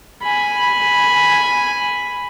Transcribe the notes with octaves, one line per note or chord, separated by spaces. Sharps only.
G#5 B5